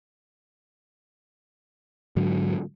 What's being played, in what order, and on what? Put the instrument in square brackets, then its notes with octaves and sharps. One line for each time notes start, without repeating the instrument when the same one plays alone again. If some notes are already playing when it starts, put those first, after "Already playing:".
[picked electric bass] G#2 D3 F#3